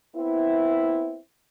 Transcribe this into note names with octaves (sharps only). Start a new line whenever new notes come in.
B3 C4 E4